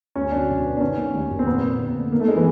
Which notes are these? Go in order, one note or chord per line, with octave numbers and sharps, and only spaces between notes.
D2 C#4
F#3 D4
B2
B3
D4
D#3 C#4
A#3
D#2
F1
C4
A#2 B3
A#3
D3
A3
D#3 A#3
A3
G#3 C4
E3